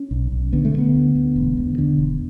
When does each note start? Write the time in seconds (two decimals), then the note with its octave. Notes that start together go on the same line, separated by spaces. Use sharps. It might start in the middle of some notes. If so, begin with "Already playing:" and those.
Already playing: C#4
0.11 B1
0.32 B1
0.53 D3 B3
0.65 A3
0.74 D3 B3
0.95 D2
1.15 D2
1.36 E1
1.57 D2
1.78 D3
1.99 E1